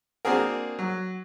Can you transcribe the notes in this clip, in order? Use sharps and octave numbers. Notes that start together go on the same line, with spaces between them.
A#3 C4 D4 F#4 G#4 A#4
F#3